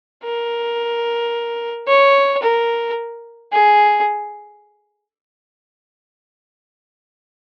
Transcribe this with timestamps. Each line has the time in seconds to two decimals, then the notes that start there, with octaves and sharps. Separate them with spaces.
0.24 A#4
1.87 C#5
2.42 A#4
3.52 G#4